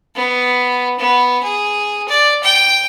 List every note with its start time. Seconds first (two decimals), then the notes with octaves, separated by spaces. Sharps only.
0.15 B3
0.99 B3
1.43 G#4
2.08 D5
2.44 G5